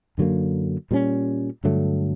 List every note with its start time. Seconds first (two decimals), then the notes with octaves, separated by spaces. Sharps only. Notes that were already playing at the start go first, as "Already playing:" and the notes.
0.18 F#2 D3 F#3 A#3
0.91 A#2 G3 A#3 C#4
1.64 G2 D3 F#3 A3